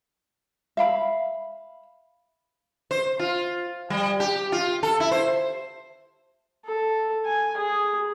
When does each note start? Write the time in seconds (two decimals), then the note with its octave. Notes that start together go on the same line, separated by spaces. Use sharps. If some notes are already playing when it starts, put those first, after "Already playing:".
0.77 E5 F5 B5
2.91 C5
3.19 F4
3.90 G3
4.20 G4
4.52 F4
4.83 A4
5.00 E4
5.11 C5
6.65 A4
7.25 G#5
7.57 G#4